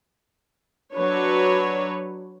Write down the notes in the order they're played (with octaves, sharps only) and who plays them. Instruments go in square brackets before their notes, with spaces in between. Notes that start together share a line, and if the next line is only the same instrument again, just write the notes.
[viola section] F#3 D4 B4 C#5